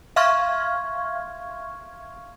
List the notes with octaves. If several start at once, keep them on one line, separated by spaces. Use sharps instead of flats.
E5 F5 C6 C#6 F6 G#6